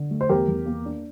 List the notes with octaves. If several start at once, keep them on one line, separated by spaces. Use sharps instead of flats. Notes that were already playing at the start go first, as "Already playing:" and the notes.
Already playing: D3
A3
C5
E2 G4 A#4
E2
A#3
D4